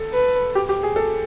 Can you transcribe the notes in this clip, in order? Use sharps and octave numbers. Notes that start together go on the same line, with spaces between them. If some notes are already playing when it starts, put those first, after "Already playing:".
Already playing: A4
B4
G4
G4
G#4
A4